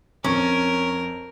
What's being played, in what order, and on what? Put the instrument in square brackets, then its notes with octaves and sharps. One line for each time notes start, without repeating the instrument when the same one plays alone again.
[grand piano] F2 C#6 F#7 [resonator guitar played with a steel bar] C#4 [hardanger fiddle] A#4